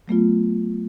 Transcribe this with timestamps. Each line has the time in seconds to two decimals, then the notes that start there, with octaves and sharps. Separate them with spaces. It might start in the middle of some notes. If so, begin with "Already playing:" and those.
0.08 F#3 A3 B3 F4